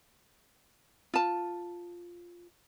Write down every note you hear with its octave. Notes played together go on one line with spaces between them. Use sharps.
F4 A5